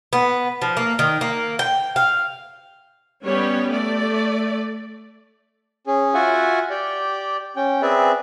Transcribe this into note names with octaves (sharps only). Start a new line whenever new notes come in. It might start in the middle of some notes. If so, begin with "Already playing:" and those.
B3
F3
A#3
D#3
A#3
G5
F5
G3 B3 C#4 G4 C#5
A3 D5
C#4 G#4
F4 F#4 E5 F#5 G#5
G4 D5 G5
C#4 G5
C4 G#4 B4 D5 E5